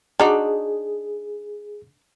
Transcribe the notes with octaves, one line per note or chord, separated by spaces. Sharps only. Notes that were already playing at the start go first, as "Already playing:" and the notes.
D4 D#4 F#4 G#4